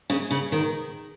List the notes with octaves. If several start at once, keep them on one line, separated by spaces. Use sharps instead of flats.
C#3
C#3
D#3